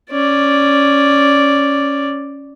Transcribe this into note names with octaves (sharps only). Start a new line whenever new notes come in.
C#4 D5